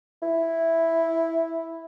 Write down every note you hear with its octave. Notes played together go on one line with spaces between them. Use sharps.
E4